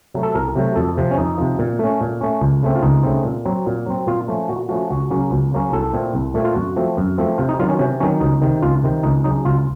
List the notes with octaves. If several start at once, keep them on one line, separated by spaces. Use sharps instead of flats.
C3 F#3 A3
A4
C2 A#4
C3 F#3 A3
F2 A4
C3 F3
C#4
F2 D#4
C3 F3
A#2
A3 C#4
A#2
A3 C#4
C#2
C#3 A3 C4
F4
C#2 D#4
C#3 A3 C4
A#2
F#3 C4
A#2
F#3 C4
A#2 F4
F3 A3 C#4
A#2 F#4
F3 A3 C#4 F#4
C#2 F#4
C#3 F#3 A#3 C#4
C#2
C#3 F#3 A#3 C#4
C2 A4
A#2 A3 C4
C2
A#2 A3 C4
F4
F#2 F#4
F3 A3 C4
F#2
F3 A3 C4
C3 F4
D#4
D#3 F#3 F4
C#4
C3 C#4
D#3 F#3 C#4
C#2 D#4
C3 D#3
C#2 F4
C3 D#3
C#2 D#4
C#3 F#3 D#4
C#2 F4